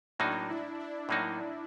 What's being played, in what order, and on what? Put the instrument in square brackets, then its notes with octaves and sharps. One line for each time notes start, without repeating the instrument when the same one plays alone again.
[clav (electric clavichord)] A2 F#3 A#3 D#4 F#4 [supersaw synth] D4
[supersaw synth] E4
D4
[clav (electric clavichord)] A2 F#3 A#3 D#4 F#4